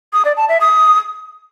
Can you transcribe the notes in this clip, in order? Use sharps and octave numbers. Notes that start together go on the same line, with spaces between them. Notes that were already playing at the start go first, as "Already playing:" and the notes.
D#6
D5
A5
E5
D#6